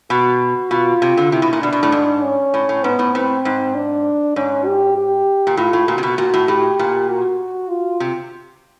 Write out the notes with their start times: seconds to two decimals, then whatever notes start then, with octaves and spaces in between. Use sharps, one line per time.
0.10 B2 F#4
0.71 B2 F4
1.02 C3
1.17 D3
1.32 C3 E4
1.42 B2
1.53 A#2
1.62 B2 D4
1.73 B2
1.83 A2
1.92 G#2
2.23 C#4
2.54 A2
2.69 A2
2.84 G#2 B3
2.99 A2
3.15 A2 C4
3.45 G#2
3.75 D4
4.36 G#2 C#4
4.66 G4
4.97 G4
5.47 A#2
5.57 A2 F4
5.73 A2
5.88 A#2 F#4
5.98 C3
6.03 B2
6.18 A#2 F#4
6.34 A2
6.48 A2 G4
6.79 A#2
7.09 F#4
7.70 F4
8.00 C3